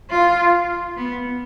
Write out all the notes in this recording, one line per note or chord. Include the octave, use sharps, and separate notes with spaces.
F4
B3